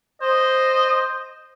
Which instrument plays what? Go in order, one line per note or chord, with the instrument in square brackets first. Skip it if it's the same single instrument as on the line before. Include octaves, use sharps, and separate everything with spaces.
[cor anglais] C5 [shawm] D#5